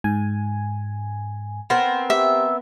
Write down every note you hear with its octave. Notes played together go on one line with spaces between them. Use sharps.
G#2 G#5
B3 C4 A#4 A#6
G4 E5